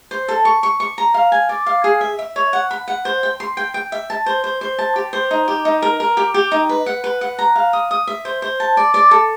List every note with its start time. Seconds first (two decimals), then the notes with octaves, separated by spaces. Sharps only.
0.11 C5
0.28 A4
0.45 C#6
0.63 C#6
0.80 C#6
0.98 A#5
1.14 F5
1.32 G#5
1.49 D5
1.66 F5
1.84 G#4
2.01 E5
2.19 E5
2.36 C#5
2.53 F#5
2.71 B5
2.88 F#5
3.05 C5
3.23 G5
3.40 C6
3.57 G5
3.74 G5
3.92 E5
4.10 A5
4.26 C5
4.44 C5
4.61 C5
4.79 A5
4.96 G4
5.13 C5
5.31 D#4
5.48 G4
5.65 D#4
5.82 A#4
6.00 A#4
6.17 G4
6.34 G4
6.52 D#4
6.69 B4
6.86 F#5
7.04 B4
7.21 F#5
7.39 A#5
7.56 F5
7.73 D#6
7.91 D#6
8.07 E5
8.25 C5
8.42 C5
8.60 A5
8.77 D5
8.94 D5
9.11 A4